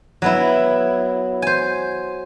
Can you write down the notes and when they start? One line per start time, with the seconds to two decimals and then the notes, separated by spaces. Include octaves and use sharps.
0.22 F#3 B3 E4
1.42 C5 G#5